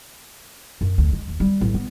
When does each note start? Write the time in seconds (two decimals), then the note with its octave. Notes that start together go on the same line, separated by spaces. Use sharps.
0.81 F#2
0.98 D2
1.12 G#3
1.28 D#2
1.40 G3
1.61 A1
1.74 B3